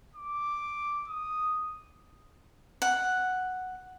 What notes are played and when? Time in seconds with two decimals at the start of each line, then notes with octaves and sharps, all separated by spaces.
0.15 D6
1.08 D#6
2.82 F#5